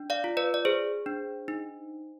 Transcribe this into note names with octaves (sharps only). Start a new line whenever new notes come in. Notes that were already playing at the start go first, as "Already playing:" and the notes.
Already playing: D4
D5 F5
F4
B4 D5
D5
G#4 C5
D4
D#4